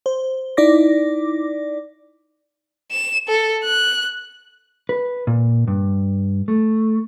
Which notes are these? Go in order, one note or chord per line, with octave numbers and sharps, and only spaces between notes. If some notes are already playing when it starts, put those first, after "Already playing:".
C5
D#4 E4 D5 D6 A#6
E7
A4
F#6
B4
A#2
G2
A3